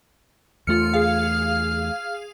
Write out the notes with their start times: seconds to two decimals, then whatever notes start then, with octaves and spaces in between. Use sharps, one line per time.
0.67 E2 A3 F4 F6 C#7
0.94 G#4 F5